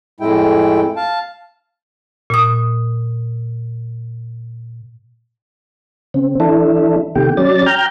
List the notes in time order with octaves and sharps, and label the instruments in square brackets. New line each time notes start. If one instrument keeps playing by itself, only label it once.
[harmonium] F2 A2 G#3 E4 G5
F5 A5
[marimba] A#2 D#6
[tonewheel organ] C#3 C4
E3 D4 E4 A4
C3 D#3 A3 G4 G5
F#3 C#4 D5 A6
G5 A#5 F6 G6